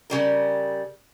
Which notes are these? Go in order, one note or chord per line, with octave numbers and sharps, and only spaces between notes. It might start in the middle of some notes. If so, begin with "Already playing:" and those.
C#3 G3 A#4